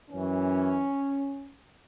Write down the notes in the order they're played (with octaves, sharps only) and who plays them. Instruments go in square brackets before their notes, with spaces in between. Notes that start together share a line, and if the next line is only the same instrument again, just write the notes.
[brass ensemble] F#2 E3 C#4